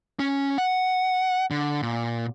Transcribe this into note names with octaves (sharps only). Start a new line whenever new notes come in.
C#4
F#5
D3
A#2